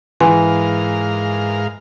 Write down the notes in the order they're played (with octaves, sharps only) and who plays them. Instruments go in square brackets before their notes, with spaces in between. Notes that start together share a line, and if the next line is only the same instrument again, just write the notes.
[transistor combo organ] G#2 A#4 F5 [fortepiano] E3 [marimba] F#5 G#5 C6